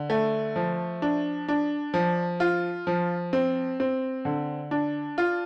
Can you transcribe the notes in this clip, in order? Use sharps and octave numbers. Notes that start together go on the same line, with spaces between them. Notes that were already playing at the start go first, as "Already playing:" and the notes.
Already playing: D3
A3
F3
D4
D4
F3
F4
F3
C4
C4
D3
D4
F4